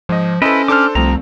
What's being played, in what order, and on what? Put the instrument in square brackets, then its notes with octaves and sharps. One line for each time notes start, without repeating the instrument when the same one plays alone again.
[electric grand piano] G#2 D#5 [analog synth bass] F3
[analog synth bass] C#4 [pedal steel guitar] E4 B4 [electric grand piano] A4 C5 D#5
[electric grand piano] D4 A4 C5 [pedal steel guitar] D6 F6
[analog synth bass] C2 [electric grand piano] F3 A3 C4 [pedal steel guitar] A#5